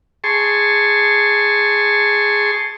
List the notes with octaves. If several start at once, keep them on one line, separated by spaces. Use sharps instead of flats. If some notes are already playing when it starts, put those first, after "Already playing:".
G#4 A5 C6 C#6